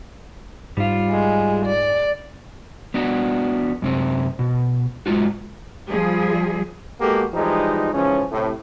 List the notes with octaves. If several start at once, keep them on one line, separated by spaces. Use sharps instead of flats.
G#2 G3 F4
G#3
D5
B3 D4 F#4
F#2 C3 C4
B2
G#2 C3 G#3 F4 F#4
F3 G3 G#4
G#3 A#3 B3 F#4 G4 A4
E3 F3 G3 G#3 D#4
G#2 C#3 E3 F3 C#4
A2 C3